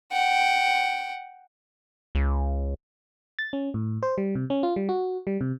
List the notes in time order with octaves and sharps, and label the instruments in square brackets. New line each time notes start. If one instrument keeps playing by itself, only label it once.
[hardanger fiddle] F#5 G5
[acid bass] C#2
[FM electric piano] A6
C#4
A2
C5
G3
C3
C#4
F4
G3
F#4
G3
C3